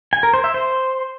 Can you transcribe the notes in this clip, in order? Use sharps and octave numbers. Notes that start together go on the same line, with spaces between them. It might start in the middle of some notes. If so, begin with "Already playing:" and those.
G#5
A#4
C5
E5
C5